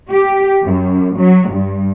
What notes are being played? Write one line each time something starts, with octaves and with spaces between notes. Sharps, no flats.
G4
F#2
F#3
G2